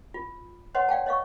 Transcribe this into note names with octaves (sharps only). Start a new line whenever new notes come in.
F4
B4 C#5 D#5 F#5 C6
D5 F5 G5 A5
C#5 D#5 F5 C#6